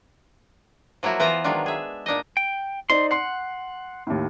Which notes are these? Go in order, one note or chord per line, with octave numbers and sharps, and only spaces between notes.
F3 F#3 A#3 E4 F#4
E3 B3 F4 B4 C5 A#5
D#3 F#3 G#3 D4 F4
G#4 E5
A#2 D4 D#4 D#5
G5
D#4 C5 D5 C6
F#5 C6 C7
D#2 A2